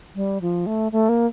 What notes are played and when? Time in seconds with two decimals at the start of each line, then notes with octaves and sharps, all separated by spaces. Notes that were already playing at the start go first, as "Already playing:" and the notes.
0.15 G3
0.41 F3
0.66 A3
0.92 A3
1.09 A#3